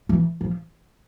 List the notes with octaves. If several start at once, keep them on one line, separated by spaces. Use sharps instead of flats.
E3
F3